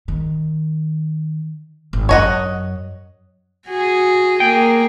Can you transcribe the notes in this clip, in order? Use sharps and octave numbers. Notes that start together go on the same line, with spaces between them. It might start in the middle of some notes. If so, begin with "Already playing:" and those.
D#3
G#1
F#2 C#5 D#5 F#5
F#4 G#4
A#3 G#4 G5